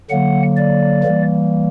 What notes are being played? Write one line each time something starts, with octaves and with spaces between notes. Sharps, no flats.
D3 F#3 A#3 F#5
D5
E3 G3 A#3